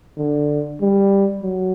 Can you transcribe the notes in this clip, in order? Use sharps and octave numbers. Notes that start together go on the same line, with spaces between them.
D3
G3
F#3